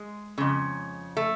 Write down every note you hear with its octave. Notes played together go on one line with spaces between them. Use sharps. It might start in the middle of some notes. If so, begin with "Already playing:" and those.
Already playing: G#3
F2 C#3
A3